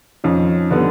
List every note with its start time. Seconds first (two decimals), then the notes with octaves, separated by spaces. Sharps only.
0.24 F2 C#4 D#4
0.71 D3 G3 B3